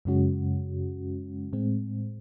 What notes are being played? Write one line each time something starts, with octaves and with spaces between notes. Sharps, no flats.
F#2 C#3 G#3 C#4 F#4
A2 G#3 C4